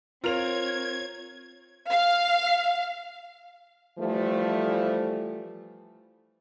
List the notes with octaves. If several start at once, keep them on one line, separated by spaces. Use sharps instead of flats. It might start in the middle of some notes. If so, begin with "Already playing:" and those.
C4 F4 A#4 C#5 G#6 F7
F5
E3 F3 G3 A3